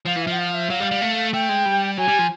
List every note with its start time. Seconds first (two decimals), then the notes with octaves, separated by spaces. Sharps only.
0.06 F3 F5
0.16 E3
0.22 E5
0.27 F3 F#5
0.38 F5
0.54 E5
0.70 F#3 F5
0.80 G3
0.91 G3
1.01 A3
1.33 A3 G5
1.49 G#3
1.65 G3
1.97 F#3 G#5
2.08 G3
2.18 F3